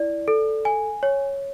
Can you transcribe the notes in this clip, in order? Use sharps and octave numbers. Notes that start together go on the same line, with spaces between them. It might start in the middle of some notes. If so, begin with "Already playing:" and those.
Already playing: E4 D5
A4
G#5
C#5